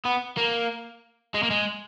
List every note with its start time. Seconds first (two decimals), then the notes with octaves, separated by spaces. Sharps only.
0.05 B3
0.37 A#3
1.35 G#3
1.43 A#3
1.51 G#3